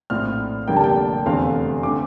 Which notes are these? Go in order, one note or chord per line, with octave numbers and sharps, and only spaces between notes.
A#1 A2 F3 C4 F6
F1 F2 D3 G3 A#3 G5
A5
G5
F1 E2 D3 A3 C4 F5
D3 A3 C4 D6